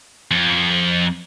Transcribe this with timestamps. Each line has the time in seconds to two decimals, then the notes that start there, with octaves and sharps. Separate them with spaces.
0.31 F2